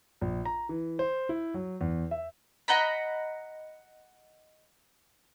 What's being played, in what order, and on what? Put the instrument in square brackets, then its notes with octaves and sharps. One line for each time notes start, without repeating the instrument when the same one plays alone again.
[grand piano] A#1
A#5
E3
C5
E4
F#3
E2
E5
[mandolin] D#5 F#5 A#5 B5